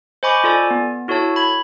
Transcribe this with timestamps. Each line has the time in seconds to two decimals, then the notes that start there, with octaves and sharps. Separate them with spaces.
0.23 C5 D#5 G#5 B5 C#6 D6
0.44 F4 A4 D5 G#5
0.71 B3
1.08 E4 F#4 A4 C#5 A5
1.36 B5 G#6